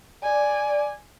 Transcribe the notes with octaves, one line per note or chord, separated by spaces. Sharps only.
D5 G#5